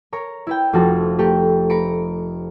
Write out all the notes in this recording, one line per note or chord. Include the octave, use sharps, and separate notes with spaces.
A#4 C#5 A#5
E4 B4 G5
F1 F2 D4 F#4 A5
A3 G4 A#4
B4 A#5 B5 C#7 D7